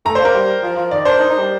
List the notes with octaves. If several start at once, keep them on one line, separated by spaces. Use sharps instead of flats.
A3 A#5
C5
A#3
A#4
G3
F3
F3
D#3 D5
D4 C5
D#4
D#4
G3